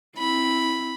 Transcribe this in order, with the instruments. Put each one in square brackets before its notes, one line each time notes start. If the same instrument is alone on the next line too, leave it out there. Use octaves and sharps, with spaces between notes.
[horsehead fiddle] C4 E4 [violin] B5